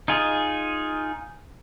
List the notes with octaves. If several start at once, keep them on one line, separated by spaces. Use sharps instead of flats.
D#4 F4 G#4